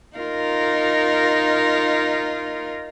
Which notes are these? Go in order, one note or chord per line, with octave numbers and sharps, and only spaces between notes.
D#4 F4 A#4